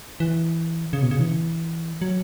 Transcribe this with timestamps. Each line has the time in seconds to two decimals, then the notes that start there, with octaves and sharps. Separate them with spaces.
0.20 E3
0.93 C#3
1.02 B2
1.11 C#3
1.20 E3
2.02 F#3